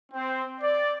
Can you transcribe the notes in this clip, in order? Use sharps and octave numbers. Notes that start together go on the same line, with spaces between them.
C4
D5